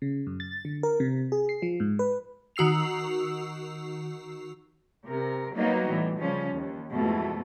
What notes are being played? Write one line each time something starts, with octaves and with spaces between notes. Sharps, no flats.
C#3
F#2
A6
D3
A#4
C3
G#4
C7
F3
G#2
B4
D#3 F#4 E6 C7 F7
C3 A#4
F#3 G3 A#3 B3 D#4 F#4
A2 E3 G3
C#3 F3 G3 C#4
D#2
F2 G#2 B2 E3 G#3 A3